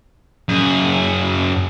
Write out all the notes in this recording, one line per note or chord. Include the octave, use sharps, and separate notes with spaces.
F#2 G#4